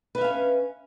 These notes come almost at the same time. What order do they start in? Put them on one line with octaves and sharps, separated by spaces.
B4 E5 F5 C#4